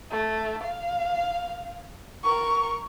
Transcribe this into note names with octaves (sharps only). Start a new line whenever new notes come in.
A3
F5
A#4 C#6